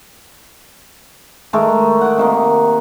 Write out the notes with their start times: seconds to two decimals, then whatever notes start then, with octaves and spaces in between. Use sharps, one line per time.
1.53 D#3 G#3 A3 A#4
2.01 F#5 D6
2.18 C3 D#3 A#3